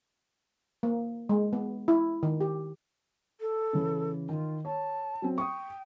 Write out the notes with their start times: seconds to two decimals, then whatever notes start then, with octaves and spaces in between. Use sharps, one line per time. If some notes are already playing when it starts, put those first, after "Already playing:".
0.83 A#3
1.29 G#3
1.53 B3
1.88 E4
2.23 D#3
2.41 G4
3.40 A4
3.73 C#3 E3
4.29 D#3 F4
4.65 C#5 A5
5.22 F#3 C4
5.38 G5 C#6 D#6